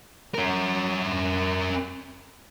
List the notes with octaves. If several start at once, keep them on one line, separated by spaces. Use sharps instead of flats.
C#4 A#4